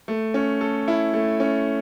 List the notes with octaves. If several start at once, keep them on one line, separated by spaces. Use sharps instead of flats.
A3
C#4
A4
E4
A3
C#4